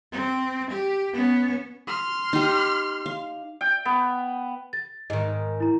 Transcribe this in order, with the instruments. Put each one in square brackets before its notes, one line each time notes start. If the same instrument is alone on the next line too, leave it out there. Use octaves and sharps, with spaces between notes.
[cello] C4
G4
B3 C#4
[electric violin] C6 F6
[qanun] D#4 G4
F5
[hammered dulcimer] G5
B3
[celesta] A6
[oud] G#2 D#3 [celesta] D#5
[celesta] E4 A#5